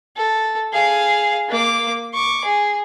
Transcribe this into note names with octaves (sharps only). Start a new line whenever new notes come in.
A4
G#4 F5
A#3 D6
C#6 D6
G#4